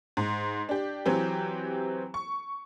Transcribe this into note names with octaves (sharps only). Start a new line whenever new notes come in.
G#2
D4 G4
E3 F#3 C4 G4
C#6